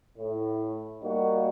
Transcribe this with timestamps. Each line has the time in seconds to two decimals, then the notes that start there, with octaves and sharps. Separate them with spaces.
0.18 A2
1.02 G3 A#3 D#4 F#4